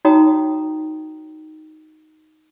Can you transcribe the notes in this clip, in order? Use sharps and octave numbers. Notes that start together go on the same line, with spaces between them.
D#4 F#4 C#5 G5 A#5 D#6